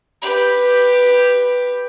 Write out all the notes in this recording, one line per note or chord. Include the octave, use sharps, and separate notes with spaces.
G4 B4